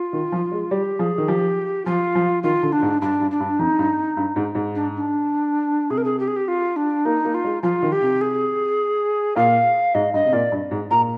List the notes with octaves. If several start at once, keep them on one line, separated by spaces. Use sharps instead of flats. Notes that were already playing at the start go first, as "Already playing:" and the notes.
Already playing: F4
D#3
F3
G#3
G3 G4
F3 G#4
D#3
F3 G4
F3 F4
F3
D#3 F4
D3
D4
G#2
G2 D4
G2
D4
G2
F2 D#4
G2
G2
G#2
G#2
D4
D4
C3 G#4
A#4
G#4
G4
G#4
G4
F4
D4
A#3 D#4
A#3
F4
G#3
F3 F4
D#3
G4
C3
G#4
A#2 F5
G#2 D#5
G2 D#5
C3
A#2 D5
G2
G#2
A#2 A#5